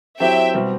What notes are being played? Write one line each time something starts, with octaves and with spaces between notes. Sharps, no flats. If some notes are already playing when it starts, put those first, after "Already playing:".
F#3 C4 E4 G4 E5 G5
B2 G3 C4